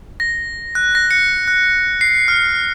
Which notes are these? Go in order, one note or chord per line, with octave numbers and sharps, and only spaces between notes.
A#6
F#6
A#6
C#7
F#6
C7
F6